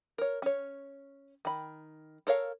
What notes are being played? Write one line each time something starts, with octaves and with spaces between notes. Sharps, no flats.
A#4 C#5
C#4 C#5
D#3 B5
A4 A#4 C#5 F5